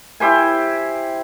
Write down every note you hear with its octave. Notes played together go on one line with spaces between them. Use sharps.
E4 G4 C5 G#5